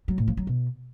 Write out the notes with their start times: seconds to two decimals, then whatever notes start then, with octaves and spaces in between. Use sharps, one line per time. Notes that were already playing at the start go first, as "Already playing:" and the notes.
0.08 F#3
0.18 A2
0.28 F3
0.37 F#3
0.47 B2